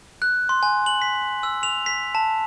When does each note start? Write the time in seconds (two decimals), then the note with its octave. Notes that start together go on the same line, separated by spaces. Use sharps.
0.22 F#6
0.49 C6
0.63 G#5
0.86 F#7
1.02 B6
1.43 E6
1.63 F7
1.86 B6
2.15 A5